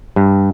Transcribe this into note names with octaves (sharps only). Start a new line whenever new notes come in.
G2